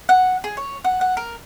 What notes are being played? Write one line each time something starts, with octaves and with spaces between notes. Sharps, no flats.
F#5
G#4
C#5
F#5
F#5
A#4